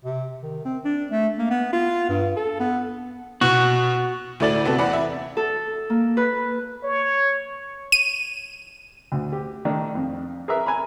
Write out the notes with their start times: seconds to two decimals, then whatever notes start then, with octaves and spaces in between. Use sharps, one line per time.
0.05 C3
0.43 D#3
0.65 C4
0.85 D4
1.11 A3
1.39 A#3
1.50 B3
1.73 F4
2.09 G2
2.37 A4
2.60 B3
3.41 B2 F#4
4.40 D2 A2 A3 D5 A6 F#7
4.65 C3 B3 C4 F#4 A4
4.78 E2 D5 F#5 B5
4.93 E5
5.37 A4
5.90 A#3
6.17 B4
6.83 C#5
7.92 D#7
9.12 D2
9.32 G4
9.65 D#3 A3 D4
9.95 F2
10.48 G#4 A#4 B4 E5
10.66 G#5 A#5 B5